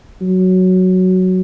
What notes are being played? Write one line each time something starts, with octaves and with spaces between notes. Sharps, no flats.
F#3